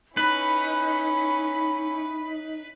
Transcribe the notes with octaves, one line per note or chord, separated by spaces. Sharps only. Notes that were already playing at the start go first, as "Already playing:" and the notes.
C#4 D#4 E4 B4 B5